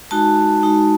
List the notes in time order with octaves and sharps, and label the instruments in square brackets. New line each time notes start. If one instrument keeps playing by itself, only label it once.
[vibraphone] G#3 D#4 F#4 A5
G#3 D#4 F#4